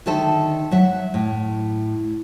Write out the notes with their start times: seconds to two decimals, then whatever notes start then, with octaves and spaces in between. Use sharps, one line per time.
0.06 D3 D#3 A4 E5 A5
0.71 F#3 E5 F#5
1.14 A2